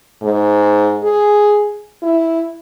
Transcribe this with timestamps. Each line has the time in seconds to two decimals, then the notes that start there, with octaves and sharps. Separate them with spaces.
0.23 G#2
1.03 G#4
2.03 E4